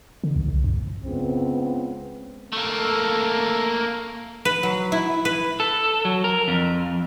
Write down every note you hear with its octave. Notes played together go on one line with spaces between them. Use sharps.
D3
C#2
C2
F#2
C#2 C#3 B3 C4
A3 A#3 A4
B4
F#3
E4
B4
A4
F#3
A#4
F2